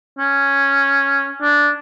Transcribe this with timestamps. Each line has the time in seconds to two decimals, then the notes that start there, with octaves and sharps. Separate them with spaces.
0.18 C#4
1.41 D4